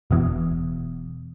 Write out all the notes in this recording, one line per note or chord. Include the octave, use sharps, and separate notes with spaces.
E1 E2